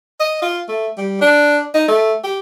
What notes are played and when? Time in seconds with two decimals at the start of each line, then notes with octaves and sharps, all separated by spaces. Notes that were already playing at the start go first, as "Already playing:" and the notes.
0.20 D#5
0.42 F4
0.69 A3
0.98 G3
1.21 D4
1.74 D#4
1.88 A3
2.24 G4